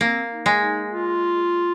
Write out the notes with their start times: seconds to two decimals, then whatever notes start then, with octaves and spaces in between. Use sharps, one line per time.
0.01 A#3 C4
0.31 D#4
0.46 G#3
0.61 D#4
0.91 F4